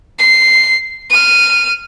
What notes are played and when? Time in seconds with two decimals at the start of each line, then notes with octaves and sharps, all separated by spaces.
0.19 C7
1.10 F6 D#7